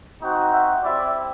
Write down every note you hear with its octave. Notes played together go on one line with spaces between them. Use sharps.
C4 D#4 F#4
E5 F#5
C4 E4 G4 D5 E5